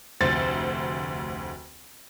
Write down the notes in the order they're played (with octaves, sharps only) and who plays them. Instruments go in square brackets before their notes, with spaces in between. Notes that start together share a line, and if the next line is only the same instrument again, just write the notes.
[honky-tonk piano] F1 D2 C5 A6